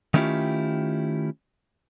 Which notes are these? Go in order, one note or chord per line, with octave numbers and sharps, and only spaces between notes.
D#3 A3 C#4 E4 F4 G4